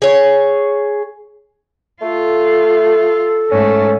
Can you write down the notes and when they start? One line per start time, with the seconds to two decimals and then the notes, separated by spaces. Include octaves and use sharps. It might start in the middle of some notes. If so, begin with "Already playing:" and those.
0.02 G#4 C#5
2.02 A3 F4 A4
3.51 G#2 A3 C#4